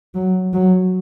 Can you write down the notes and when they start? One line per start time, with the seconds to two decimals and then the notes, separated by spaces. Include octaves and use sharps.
0.15 F#3
0.54 F#3